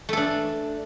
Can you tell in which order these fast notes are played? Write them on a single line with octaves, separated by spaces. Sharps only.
A3 A4 D4